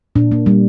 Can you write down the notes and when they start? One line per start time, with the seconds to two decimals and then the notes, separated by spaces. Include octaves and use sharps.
0.16 A#2 D4
0.32 A#3
0.46 G3